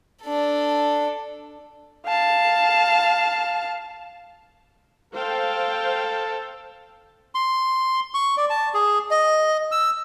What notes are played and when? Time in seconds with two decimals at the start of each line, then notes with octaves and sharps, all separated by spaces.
0.23 D4 A4
2.06 F5 A5
5.14 A4 C5 F5 G5
7.35 C6
8.14 C#6
8.37 D5
8.50 A5
8.74 G#4
9.11 D#5
9.72 E6